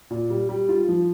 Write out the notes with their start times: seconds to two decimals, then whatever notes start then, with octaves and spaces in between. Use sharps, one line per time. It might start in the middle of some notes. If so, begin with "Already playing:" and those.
0.10 A#2
0.30 G3
0.49 G3
0.69 F4
0.89 F3